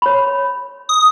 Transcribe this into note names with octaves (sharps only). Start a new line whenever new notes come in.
C#5 B5
D#6